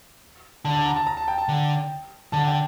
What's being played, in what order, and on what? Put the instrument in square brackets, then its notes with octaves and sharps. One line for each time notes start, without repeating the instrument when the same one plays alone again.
[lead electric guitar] D3 [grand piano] A5
[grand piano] A5
A#5
A5
A#5
A5
G5
A5
[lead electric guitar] D3
[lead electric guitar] D3 [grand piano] A5
[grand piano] G5